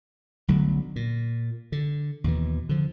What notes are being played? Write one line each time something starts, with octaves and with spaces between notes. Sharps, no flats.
B1 D3 F#3 A3
A#2
D3
D#2 B2 E3
D3 F3